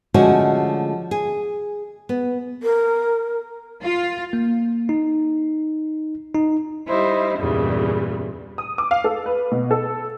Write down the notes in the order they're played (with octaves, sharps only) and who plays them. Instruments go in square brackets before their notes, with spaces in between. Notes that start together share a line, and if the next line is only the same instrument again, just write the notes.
[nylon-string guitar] D3 F3 G#3 A3 C#4 F#4
G#4
B3
[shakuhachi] A#4
[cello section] F4
[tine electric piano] A#3
D#4
D#4
[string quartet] G3 D#4 E4 C5
E2 G2 A#2 C#3 G3
[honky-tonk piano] D#6
D6
F5
A4
B4
B2
A4